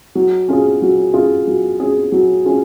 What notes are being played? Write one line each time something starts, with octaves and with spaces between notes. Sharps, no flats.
F#3
C#4 F4 G#4
F#3
C#4 F4 G#4
F#3
C#4 F4 G#4
F#3
C#4 F4 G#4